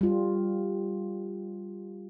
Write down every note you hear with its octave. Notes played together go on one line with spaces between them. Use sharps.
G3 F4